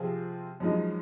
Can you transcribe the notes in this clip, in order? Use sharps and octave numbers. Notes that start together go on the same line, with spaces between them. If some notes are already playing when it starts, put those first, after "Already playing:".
Already playing: C3 F3 C4 F4 G#4
F#2 F3 G#3 D#4